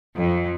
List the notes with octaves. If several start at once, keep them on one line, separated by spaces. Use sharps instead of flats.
F2